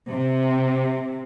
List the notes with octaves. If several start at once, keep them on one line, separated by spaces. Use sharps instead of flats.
C3